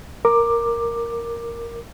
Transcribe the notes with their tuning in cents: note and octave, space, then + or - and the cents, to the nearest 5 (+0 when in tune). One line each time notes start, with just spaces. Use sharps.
A#4 +0 D6 +10